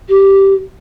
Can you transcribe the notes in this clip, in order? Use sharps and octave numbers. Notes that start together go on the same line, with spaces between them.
G4